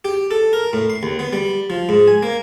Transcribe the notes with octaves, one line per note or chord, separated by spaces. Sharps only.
G4
A4
A#4
A2
C6
D#2
B3
G3
F3
G#2
G#5
A#3